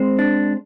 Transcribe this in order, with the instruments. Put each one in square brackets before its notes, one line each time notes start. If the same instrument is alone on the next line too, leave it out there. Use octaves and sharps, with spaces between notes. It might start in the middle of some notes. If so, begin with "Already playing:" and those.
Already playing: [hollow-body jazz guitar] G#3 C4 C5
D4